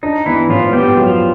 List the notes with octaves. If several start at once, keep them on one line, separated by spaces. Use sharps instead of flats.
D4 D#4
E3 B3 E4
A2 F3 F4
G3 B3 G4
F3 F#3 F4